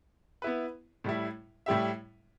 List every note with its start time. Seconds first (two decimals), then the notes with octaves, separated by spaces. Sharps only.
0.42 B3 E4 B4
1.04 A2 G3 E4
1.66 A2 G3 E4 G4 E5